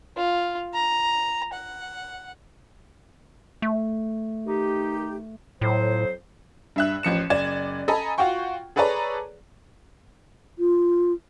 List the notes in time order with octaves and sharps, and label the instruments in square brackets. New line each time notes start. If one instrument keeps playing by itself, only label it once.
[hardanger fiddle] F4
A#5
F#5
[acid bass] A3
[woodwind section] D#3 D#4 G4
[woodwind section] F2 F#3 C5 [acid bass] A2
[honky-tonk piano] G2 E5 F#6
A1 F3 C#7 E7
F#1 D5 G#6 E7
A4 D#5 G#5 A#5 B5
F4 F#4 F#5 G5 C#6
G#4 A4 B4 C#5 D5 A#5
[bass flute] F4